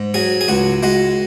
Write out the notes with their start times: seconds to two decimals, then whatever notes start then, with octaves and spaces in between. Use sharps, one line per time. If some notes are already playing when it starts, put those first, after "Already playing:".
Already playing: G#2
0.14 F#3 G#4
0.41 G#4
0.48 C#2 F#4
0.83 G#3 F#4